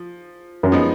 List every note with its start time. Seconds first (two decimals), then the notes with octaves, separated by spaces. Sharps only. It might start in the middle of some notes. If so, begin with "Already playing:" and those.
Already playing: F3
0.63 F#2
0.72 F3 G#3 B3 D#4